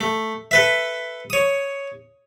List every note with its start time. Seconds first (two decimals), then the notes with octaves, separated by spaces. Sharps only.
0.01 A3
0.51 A4 B4 E5
1.30 C#5 D#6